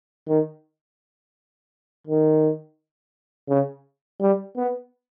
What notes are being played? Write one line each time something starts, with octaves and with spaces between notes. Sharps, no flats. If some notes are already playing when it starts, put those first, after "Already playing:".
D#3
D#3
C#3
G3
B3